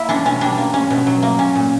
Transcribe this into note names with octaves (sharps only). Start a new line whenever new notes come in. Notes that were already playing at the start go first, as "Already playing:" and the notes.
Already playing: A#3 E4
C#4 D4
B2 C#4
G3 D4
A#3
C#4
B2
F#3
A#3
C#4
A#2